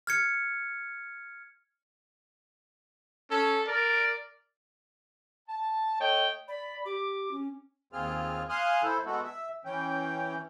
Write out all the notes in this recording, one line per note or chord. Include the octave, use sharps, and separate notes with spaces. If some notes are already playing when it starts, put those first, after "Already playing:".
F6 G#6 C#7
C#4 A4
A#4 D5
A5
A3 C#5 D#5 G5
D5 B5
G4 D6
C#4
D#2 C4 F4 G#4 F6
F5 G#5 C6 D#6 F6 F#6
E4 A4 C5
G#3 A3 B3 F#4 A4
E5
E3 C#4 G5